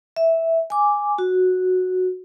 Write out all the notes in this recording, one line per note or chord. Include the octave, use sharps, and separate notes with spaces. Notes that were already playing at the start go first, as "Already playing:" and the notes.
E5
G#5 D6
F#4